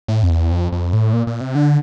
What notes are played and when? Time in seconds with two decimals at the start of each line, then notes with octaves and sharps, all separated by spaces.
0.08 A2
0.23 F2
0.29 E2
0.51 F2
0.72 F2
0.93 A2
1.13 A#2
1.27 A#2
1.41 C3
1.55 D3